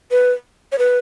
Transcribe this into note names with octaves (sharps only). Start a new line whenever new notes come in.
B4
C#5
B4